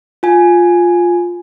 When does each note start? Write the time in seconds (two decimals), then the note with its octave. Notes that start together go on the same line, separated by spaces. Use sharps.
0.23 F4 G#5